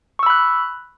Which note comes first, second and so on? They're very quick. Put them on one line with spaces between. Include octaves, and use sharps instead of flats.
C#6 E6 B5 F#6